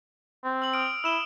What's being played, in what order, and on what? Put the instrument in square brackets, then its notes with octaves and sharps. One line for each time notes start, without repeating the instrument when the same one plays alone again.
[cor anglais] C4
[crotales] E6 F#7
D#6 F6 D7
[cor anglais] E4 [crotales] E6 E7 G7